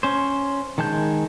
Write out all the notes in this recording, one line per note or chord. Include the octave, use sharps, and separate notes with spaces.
C#4 C5
D#3 G#3 A5 G6